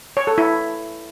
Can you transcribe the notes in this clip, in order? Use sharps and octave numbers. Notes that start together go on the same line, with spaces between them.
C#5
A4
E4